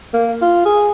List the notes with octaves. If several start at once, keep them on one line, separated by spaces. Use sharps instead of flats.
A#3
F4
G#4